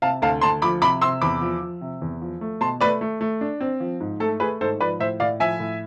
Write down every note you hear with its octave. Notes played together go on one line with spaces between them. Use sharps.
C3 F5 A5
D2 F5 A5
D2 A5 C6
F3 B5 D6
C3 B5 D6
C3 C6 E6
E2 B5 D6
F3
F3
C3
E2
F3
A3
B2 A5 C6
A3 B4 D5
A3
A3
D4
C4
F3
G#2
A3 A4
A3 G#4 B4
G#2 A4 C5
F3 B4 D5
A2 C5 E5
A2 D5 F5
F3 E5 G#5
A2